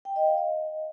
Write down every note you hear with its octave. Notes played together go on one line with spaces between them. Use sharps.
G5
D#5
F5
D#5